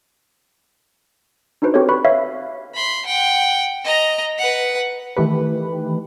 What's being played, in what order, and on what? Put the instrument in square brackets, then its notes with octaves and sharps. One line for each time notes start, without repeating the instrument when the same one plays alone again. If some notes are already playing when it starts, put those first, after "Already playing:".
[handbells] D4 D#4 F#4 B4 C5
C4 F#4 G4 A4 C5 C#5
B4 D5 B5 C#6 F#6
C#5 E5 F5
[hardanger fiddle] B5 C6
F#5 G5
D#5 A#5
B4 F#5
[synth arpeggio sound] D#3 E3 A3 G4 B4